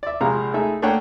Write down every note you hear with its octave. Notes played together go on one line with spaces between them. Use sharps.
D5 E5
A#1 C3 G#3 F5 A#5
A3 D#4 G#4 E5
A3 A#3 D4 C#5 F#5 G5